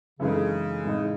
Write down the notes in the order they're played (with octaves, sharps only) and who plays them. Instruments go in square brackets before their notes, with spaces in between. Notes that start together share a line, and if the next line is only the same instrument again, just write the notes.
[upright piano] F#2 E3 G#3 D#4 A4 [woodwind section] C#3
[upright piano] A2 G#3 D#4